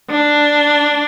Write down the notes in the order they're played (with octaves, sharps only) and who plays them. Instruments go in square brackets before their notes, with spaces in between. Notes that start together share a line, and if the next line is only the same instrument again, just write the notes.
[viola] D4